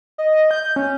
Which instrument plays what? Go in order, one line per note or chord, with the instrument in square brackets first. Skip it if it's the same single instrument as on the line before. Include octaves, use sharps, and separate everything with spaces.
[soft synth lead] D#5
G6
C#4